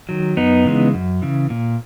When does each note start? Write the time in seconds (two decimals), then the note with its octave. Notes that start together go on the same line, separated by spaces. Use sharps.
0.09 D#3 F#3
0.37 F#2 B3 D#4
0.65 C#3 E3 G#3
0.94 F#2
1.22 C#3 E3
1.50 A#2